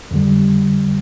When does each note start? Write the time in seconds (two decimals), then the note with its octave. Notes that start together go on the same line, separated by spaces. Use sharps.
0.11 F2 D3 G3